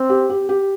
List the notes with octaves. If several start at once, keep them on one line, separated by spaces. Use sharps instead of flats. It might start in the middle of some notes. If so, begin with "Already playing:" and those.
Already playing: C4
G4
G4
G4